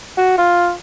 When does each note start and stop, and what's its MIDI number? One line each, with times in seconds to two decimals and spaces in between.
0.17 0.35 66
0.38 0.72 65